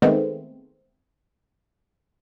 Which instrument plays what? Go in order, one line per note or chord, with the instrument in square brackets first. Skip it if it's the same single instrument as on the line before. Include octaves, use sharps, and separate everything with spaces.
[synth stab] D#3 G#3 A3 B3 C4